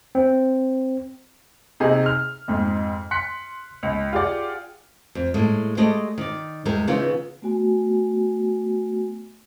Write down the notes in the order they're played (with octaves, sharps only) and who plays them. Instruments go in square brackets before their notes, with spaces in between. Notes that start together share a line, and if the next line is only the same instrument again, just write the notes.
[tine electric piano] C4
[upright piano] C3 D#4 G4 G#4
F6
F2 G#2
C6 F#6 B6 C#7
C#2
F4 G4 G#4 D5 F#5
[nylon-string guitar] F2
A2 G#3 A#3
G#3 A3 G4 D5 D#5
D#3 D5
E2 G3 G#3 A#4
C#3 E3 B3 D#4 F4
[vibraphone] A3 B3 F#4 G#5